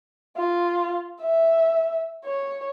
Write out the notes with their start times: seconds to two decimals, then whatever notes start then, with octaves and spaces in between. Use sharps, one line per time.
0.37 F4
1.21 E5
2.25 C#5